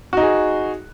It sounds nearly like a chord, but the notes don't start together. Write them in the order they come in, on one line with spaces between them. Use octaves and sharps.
F#4 D#4 G#4